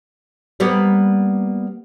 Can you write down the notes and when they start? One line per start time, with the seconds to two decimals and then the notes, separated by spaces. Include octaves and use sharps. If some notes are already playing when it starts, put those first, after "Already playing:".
0.60 G3 A#3 B3